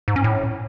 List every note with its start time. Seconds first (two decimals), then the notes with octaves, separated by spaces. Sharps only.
0.08 G#2
0.16 C#4
0.24 A2